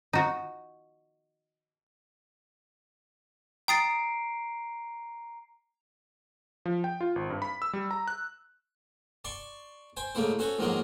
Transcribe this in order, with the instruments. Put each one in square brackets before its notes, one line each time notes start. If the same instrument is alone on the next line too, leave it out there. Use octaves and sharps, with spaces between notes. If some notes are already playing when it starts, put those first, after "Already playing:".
[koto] D#4 F#4
[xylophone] G5 D#6 A6 [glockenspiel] A#5 C7 D7
[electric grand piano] F3
G5
F4
G#1
G2
B5
E6
G3
A#5
F#6
[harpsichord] D5 A5 C6 C#6
C5 G5 G#5
G#2 C#3 A3 A#3 E4 C5
C#4 F#4 A4 C5 C#5
G#2 D#3 F3 F#3 G#3 A#3